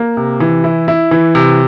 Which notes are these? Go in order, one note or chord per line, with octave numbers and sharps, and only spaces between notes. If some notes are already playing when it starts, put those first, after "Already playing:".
Already playing: A#3
C3
E3
E4
E4
E3
C3